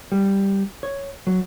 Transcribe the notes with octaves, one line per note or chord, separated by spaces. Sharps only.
G3
C#5
F#3